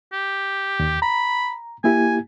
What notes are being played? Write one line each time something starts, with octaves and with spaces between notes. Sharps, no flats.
G4
D#2
A#5 B5
A#3 E4 G4 G#5